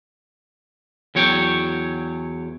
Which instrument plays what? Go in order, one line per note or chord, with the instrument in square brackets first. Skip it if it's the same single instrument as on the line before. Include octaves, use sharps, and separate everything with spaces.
[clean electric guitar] E2 F#3 C#5 G5